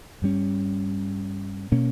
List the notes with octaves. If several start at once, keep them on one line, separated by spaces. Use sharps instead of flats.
G2 G3 C#4
B2 A#3 C#4